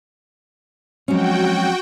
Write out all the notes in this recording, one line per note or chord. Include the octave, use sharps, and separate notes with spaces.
F3 F#3 G#3 C4 C#4 F#4 G5